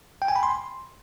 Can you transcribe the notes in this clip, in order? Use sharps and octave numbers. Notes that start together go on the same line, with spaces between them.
G5
G#5
B5
C6